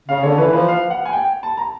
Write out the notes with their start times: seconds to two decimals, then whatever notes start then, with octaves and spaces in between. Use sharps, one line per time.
0.09 C#3 F5
0.23 D3 C#5
0.38 E3 B4
0.53 F3 B4
0.68 F5
0.90 F#5
1.06 G#5
1.13 G5
1.43 A5
1.57 A#5